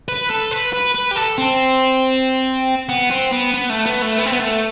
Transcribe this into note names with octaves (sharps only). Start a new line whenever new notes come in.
B4
A4
B4
B4
B4
G4
A4
C4
B3
C4
B3
B3
A3
B3
A3
B3
C4
B3
A3